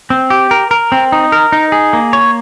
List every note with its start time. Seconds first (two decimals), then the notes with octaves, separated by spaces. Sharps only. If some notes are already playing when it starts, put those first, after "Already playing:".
0.10 C4
0.30 G4
0.51 A#4
0.71 A#4
0.92 C4
1.12 D#4
1.32 A#4
1.52 D#4
1.72 G#4
1.93 A#3
2.13 C#5